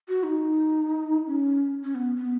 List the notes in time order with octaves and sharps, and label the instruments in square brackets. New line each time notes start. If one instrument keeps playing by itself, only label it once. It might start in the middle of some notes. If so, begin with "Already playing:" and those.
[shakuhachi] F#4
D#4
C#4
C#4
B3
B3